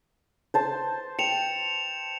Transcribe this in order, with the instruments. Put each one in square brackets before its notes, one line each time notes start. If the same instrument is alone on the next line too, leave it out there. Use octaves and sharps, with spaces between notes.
[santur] C5 A5 C6
[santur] G5 [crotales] C#7 E7 F7